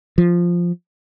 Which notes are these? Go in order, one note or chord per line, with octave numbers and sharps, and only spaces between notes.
F3